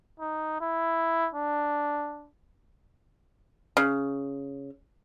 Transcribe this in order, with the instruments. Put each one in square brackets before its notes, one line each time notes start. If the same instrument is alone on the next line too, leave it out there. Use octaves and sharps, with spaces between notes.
[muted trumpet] D#4
E4
D4
[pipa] C#3